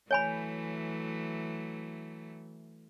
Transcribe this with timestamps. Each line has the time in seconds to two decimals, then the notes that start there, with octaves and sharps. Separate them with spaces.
0.11 E3 F#3 A3 C#5 G#5 B5